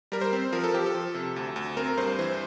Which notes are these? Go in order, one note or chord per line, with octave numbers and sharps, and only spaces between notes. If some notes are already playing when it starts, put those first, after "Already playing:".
G3 A#4
C5
C4
F3 A#4
A4
F3 G4
A4
F3
C3
D2
D2
C4 A#4
G2 C5
E3 C5